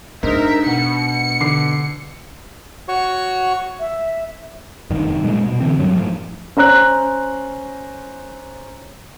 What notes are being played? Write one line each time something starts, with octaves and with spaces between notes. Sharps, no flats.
G#2 D4 D#4 A#4 E5
B2 F#5 C#7
D3 D6 C7
F#4 C#5 C#6
E5
F1 G2 D#3
A#2 G3 G#3
B2
D3 E3 C4
G2 F#3 G3
A2 F3
C#4 C5 A#5 F#6